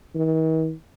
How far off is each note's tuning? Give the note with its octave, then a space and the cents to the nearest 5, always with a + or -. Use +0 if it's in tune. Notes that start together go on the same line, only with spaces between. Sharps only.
D#3 +45